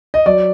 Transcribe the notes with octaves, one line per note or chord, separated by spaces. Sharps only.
D#5
F#3 D5